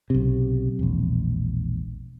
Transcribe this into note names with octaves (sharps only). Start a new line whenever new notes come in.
B1 C3
E1 A#1